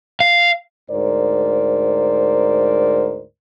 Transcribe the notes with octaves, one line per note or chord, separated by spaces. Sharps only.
F5
D2 G#2 A#4 C5 D5